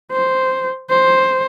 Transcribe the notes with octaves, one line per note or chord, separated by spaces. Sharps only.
C5
C5